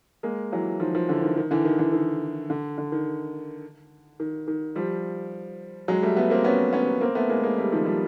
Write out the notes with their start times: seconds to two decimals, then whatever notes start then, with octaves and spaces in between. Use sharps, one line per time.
0.23 G#3 A#3
0.52 E3 F#3
0.80 D#3 F3
0.94 D#3 F3
1.08 D3 E3
1.23 D#3
1.37 D#3
1.51 D3 E3
1.65 D#3
1.79 D3 E3
1.93 D#3
2.50 D3
2.78 D3
2.92 D#3
4.20 D#3
4.48 D#3
4.76 F3 G3
5.88 F#3 G#3
6.02 G3 A3
6.16 A3 B3
6.30 A#3 C4
6.44 B3 C#4
6.73 B3 C#4
7.01 A#3 C4
7.15 A3 B3
7.30 G#3 A#3
7.43 G#3 A#3
7.57 G3 A3
7.72 D#3 F3
7.85 F3 G3